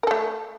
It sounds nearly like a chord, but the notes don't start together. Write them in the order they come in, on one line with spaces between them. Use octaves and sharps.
A#4 A4 A3